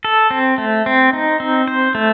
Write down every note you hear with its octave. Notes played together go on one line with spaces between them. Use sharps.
A4
C4
A3
C4
D#4
C4
C5
A3